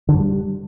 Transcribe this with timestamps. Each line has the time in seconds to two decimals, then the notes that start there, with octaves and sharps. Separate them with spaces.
0.09 D3
0.14 F#2
0.19 G3